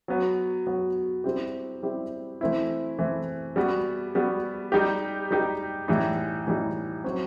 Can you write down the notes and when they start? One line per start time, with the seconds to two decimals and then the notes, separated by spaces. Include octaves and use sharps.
0.08 F#3 B3 F#4
0.67 F#3 B3 F#4
1.24 G3 C4 E4 G4
1.82 G3 C4 E4 G4
2.41 E3 A3 C4 E4
2.98 E3 A3 C4 E4
3.56 G3 B3 F#4
4.15 G3 B3 F#4
4.72 G3 D#4 G4
5.31 G3 D#4 G4
5.88 A2 E3 G3 D#4
6.47 A2 E3 G3 D#4
7.04 F#3 C4 F#4